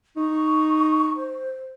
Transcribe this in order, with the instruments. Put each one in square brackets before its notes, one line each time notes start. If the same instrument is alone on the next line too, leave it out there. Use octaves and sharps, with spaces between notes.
[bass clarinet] D#4 [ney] C#6
[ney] C5